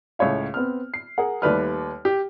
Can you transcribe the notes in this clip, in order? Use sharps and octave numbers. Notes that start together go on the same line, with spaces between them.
C#2 A2 C#5 F5
B3 C4 F6
C7
G#4 A#4 F#5
D#2 G3 A3 B4 D5 F6
G4